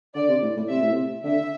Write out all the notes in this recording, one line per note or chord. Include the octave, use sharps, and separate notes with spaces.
D3 D5
C3
A2
A2
C3 E5
A2
C3
D3 E5